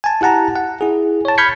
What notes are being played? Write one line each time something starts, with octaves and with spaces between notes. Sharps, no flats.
G#5 A5
E4 G4 F#5 A5 A#5
F#5
E4 G#4
C#5 A5
B5 F6 G6 G#6 B6 C#7